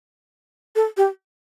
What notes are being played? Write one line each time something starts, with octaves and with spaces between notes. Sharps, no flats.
A4
G4